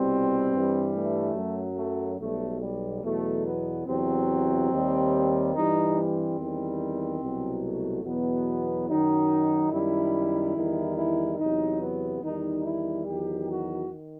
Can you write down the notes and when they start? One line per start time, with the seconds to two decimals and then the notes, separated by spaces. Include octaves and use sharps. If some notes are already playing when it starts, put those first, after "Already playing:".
Already playing: C2 B2 G3 C4
0.51 G2 E3 G3
0.94 A3
1.35 F#2 F#3
1.77 A3
2.18 B1 B2 G3 A3
2.61 G3
3.02 E2 B2 F#3 A3
3.45 B3
3.86 E2 C3 F#3 C4
4.70 D#2 D#3 G3
5.53 G2 E3 G3 D#4
5.96 C4
6.37 E2 D#3 G3
7.21 C2 B2 F#3
7.63 A3
8.04 E2 B2 F#3 B3
8.88 F#2 D#3 F#3 D#4
9.71 F#2 D#3 G3 E4
10.55 E2 D#3 G3
10.97 E4
11.39 E2 C3 F#3 D#4
11.80 B3
12.22 E2 D#3 G3 D#4
12.64 E4
13.06 E2 D#3 F#3 G4
13.48 F#4
13.89 D#3